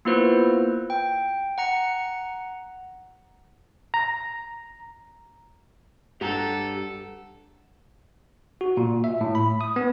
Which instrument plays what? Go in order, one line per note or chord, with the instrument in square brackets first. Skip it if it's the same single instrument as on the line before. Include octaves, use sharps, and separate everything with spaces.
[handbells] A#3 B3 E4 F4 B4 C5
G5
F#5 A#5 C#7
[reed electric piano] A#5
[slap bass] G2 [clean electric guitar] G4 F#5 A#5 [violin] A4
[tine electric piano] F#4
A#2
E5
A2
B5
D#6
B3